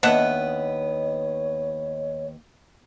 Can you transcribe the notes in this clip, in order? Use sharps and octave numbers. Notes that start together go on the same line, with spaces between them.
D#2 B3 D4 B4 C#5 D#5 E5 F#5